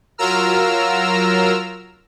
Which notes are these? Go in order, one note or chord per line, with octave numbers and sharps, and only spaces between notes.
F#3 F4 A#4 A#5 E6 F6